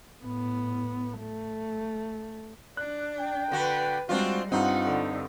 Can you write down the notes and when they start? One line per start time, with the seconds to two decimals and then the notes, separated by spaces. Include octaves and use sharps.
0.21 A2 B3
1.19 A3
2.77 D4 F#6
3.20 G5
3.52 D3 F#4 B4
4.09 G3 G#3 C4 D4 F4 F#4
4.52 G2 C4 D#4 F4 F#5
4.84 D3